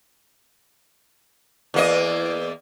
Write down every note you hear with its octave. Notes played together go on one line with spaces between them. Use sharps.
E2 A#3 D#5